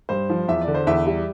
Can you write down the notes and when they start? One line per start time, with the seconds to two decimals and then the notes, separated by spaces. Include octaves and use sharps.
0.09 G2 C5
0.29 F3
0.48 E2 E5
0.61 D5
0.68 D3
0.75 C5
0.87 E2 E5
1.06 G3 E5